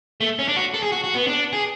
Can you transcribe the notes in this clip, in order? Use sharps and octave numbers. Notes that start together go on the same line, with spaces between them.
A3
C#4
D4
F#4
A4
G#4
F#4
F#4
B3
D4
G#4